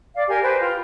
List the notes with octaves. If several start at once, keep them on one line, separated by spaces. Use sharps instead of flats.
D5 F5
G4 A#4 G#5
B4 C5 G5
F4